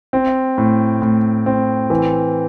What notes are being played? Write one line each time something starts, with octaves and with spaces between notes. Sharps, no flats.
C4
A2
A2
C4
E3